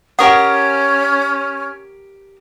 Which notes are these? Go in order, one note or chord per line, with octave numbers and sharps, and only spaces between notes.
C#4 G4 A#4 F#5 D#6